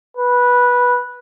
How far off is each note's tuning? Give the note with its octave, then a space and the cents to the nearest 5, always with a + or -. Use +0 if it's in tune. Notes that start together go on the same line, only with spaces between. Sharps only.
B4 -10